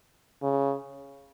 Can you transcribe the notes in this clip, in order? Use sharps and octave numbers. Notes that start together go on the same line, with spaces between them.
C#3